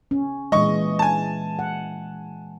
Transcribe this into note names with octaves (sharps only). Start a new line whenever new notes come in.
C#4
A#2 E3 G#3 D#5 C#6
G#5 A5
F#5